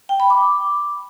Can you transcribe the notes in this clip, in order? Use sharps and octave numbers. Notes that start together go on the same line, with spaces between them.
G5
B5
D6